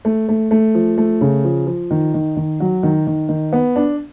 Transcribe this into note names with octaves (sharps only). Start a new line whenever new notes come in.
A3
A3
A3
F3
A3
C#3
F3
F3
D#3
D#3
D#3
F#3
D#3
D#3
D#3
B3
D4